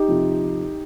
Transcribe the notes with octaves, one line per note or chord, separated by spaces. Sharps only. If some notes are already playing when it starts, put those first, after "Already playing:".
Already playing: D#4 G4
F2 C3 F3